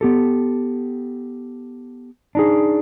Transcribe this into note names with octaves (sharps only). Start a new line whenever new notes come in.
B3 G4 A4
D4 D#4 G#4